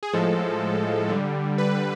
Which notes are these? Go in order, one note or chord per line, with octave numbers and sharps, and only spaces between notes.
G#4
A2 F3 G#3 A4
D3 G3
B4